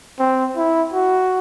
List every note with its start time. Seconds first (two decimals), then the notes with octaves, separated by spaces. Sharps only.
0.19 C4
0.57 E4
0.93 F#4